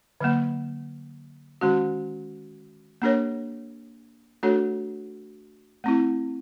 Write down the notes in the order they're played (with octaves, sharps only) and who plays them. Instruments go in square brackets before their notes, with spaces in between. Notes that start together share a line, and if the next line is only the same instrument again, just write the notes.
[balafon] D3 F#3 A#3
D#3 G#3 C#4 F#4
A#3 D4 G4 A#4 C#5
A3 D4 F#4 A4 C#5
A3 C4 E4